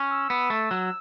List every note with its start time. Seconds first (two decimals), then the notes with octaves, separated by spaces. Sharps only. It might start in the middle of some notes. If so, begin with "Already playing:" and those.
Already playing: C#4
0.10 E6
0.30 B3
0.50 A3
0.71 F#3